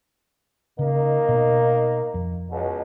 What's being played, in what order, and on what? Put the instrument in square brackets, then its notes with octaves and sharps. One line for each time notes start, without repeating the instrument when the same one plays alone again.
[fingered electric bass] C#3 [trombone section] A#3 D#4
[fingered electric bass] B2
F2
[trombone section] C#2 B2